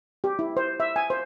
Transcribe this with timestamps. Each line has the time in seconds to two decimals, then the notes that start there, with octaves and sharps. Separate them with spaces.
0.24 G4
0.39 E4
0.57 C5
0.80 E5
0.96 G#5
1.10 C5